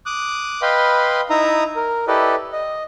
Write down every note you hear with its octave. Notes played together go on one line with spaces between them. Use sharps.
D6 D#6 F#6
B4 D#5 F5 G5 B5 C6
D#4 E4 E5 A#5 D#6
A#4
E4 G4 A4 B4 D5 D#5
D#5